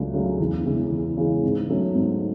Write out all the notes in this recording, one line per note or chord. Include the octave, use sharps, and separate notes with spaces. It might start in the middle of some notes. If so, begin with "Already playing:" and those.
Already playing: C#2 C#3 F#3 A3 D4
C#3 F#3 A3 D4
E2
C#3 E3 G#3
E2
C#3 E3 G#3
G#2
F#3 A3 C#4
G#2